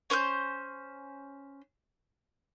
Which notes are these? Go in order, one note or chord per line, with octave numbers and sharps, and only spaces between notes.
C#4 C5 C#6 G6